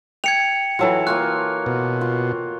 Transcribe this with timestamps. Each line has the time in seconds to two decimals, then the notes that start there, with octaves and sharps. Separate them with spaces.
0.24 G5 G#6 C#7 F7
0.79 E3 F#3 F4 F#4 A4
1.07 A#3 F4 C#5 F#6
1.66 B2
2.01 F4